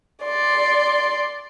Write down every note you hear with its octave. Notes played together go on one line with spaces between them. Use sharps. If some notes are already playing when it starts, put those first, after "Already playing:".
D5 C6